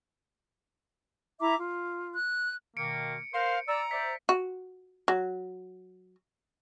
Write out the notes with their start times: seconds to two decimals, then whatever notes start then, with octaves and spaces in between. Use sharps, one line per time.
1.40 E4 E5 A#5 D6
1.57 F4
2.16 F#6
2.77 B2 D#3 A#3 C#7 D7
3.34 A#4 C5 F5
3.68 D5 A#5 E6
3.91 C5 D5 E5 B6
4.29 F#4
5.08 F#3